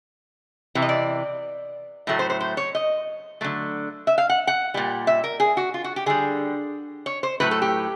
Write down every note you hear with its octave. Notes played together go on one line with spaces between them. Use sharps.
C3 E3
D#5
D5
A2 F#3 A3
C5
C5
C5
C#5
D#5
D3 F#3 A3
E5
F5
F#5
F#5
A#2 G3
E5
A#4
G#4
F#4
F4
F#4
G4
D3 G3 G#4
C#5
C5
A2 F#3 A3 B4
A4
G4